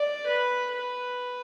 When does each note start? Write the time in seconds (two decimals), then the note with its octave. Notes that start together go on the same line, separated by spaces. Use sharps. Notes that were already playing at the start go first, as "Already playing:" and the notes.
Already playing: D5
0.27 B4
0.72 B4